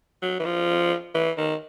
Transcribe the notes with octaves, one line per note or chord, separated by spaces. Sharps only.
F#3
E3
F3
E3
D#3